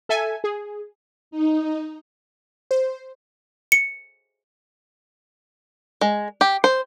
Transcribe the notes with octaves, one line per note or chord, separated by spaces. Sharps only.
A4 E5 G#5
G#4
D#4
C5
C#7
G#3
G4
C5